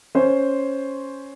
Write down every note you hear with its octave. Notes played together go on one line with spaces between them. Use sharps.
C#4 C5